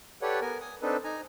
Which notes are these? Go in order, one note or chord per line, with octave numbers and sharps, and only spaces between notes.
G4 A4 B4 C#5 D5 F#5
B3 A#4 G#5
G#5 D#6
C4 D4 D#4 A4 B4
D#4 G#5 A#5